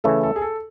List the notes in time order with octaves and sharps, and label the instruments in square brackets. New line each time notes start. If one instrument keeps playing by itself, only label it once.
[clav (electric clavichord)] C#3 E3 A3 [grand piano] A4
[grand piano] A4
G#4
A4